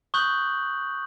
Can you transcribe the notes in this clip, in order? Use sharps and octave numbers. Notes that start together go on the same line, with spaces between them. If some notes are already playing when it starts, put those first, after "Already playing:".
C#6 D#6 F#6 G6 F#7